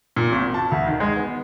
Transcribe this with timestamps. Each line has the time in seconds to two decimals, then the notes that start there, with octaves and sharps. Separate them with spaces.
0.16 A#2
0.32 G#1
0.54 A5
0.72 D2
0.87 D#3
1.00 G#3
1.16 B3